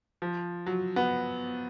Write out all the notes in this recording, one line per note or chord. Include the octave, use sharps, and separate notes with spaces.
F3
F#3
B3